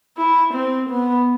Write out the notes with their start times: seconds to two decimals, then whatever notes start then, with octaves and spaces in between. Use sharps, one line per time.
0.17 E4
0.54 C4
0.90 B3